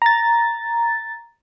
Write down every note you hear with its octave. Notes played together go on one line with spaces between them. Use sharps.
A#5 A6